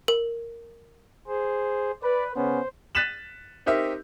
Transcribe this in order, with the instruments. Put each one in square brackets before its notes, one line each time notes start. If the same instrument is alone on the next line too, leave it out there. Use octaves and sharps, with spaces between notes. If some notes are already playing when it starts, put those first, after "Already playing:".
[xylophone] A#4
[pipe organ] G#4 C5
[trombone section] B4 [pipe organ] D5
[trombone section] C#3 B3 C#4 [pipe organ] C5
[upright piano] F#6 A6 B6 D#7 E7 F#7
C4 D#4 G4 A#4 E5